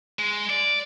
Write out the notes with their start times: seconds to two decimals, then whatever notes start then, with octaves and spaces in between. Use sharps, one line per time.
0.19 G#3
0.50 D5